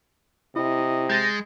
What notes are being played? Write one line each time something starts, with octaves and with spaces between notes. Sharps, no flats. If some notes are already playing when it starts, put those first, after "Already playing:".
C3 E4 D#5
G#3 G6 A6 A#6